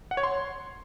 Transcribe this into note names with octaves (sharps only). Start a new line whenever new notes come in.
F#5
C#5
C6